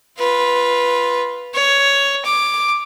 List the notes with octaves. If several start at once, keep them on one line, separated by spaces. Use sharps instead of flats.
F4 B4
C#5
D6